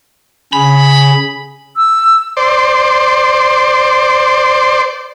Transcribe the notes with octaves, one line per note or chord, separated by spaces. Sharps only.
C#3 G#4 B5
E6
C5 D5